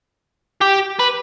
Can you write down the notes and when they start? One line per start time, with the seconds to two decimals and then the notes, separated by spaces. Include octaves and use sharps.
0.61 G4
0.99 B4